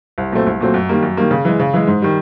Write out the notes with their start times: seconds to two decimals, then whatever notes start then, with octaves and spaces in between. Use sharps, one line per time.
0.18 C2
0.32 A#2 F#3 A3 C4
0.47 C2
0.60 A#2 F#3 A3 C4
0.74 F#2
0.89 D#3 G3 A#3
1.02 F#2
1.17 D#3 G3 A#3
1.31 C#3
1.45 E3 G#3
1.59 C#3
1.74 E3 G#3
1.87 G#2
2.02 D#3 G3